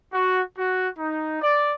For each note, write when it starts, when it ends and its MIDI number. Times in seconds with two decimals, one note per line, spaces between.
0.13 0.43 66
0.58 0.89 66
0.98 1.40 63
1.42 1.74 74